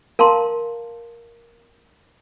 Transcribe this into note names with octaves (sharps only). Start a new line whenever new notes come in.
A#4 F5 A5 A#5 C6